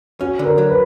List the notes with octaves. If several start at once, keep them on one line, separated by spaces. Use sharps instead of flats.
C#4 F#4
D3
A#4
F#3
B4